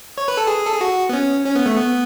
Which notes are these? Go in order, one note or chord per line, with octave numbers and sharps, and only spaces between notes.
C#5
B4
A4
G#4
A4
G#4
F#4
B3
C#4
C#4
B3
A3
B3